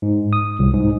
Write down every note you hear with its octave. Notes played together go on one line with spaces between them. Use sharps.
G#2
D#6
C2
G#2